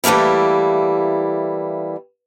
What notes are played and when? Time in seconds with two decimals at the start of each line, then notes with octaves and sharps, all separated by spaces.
0.04 E3 G3 A3 A#3 E4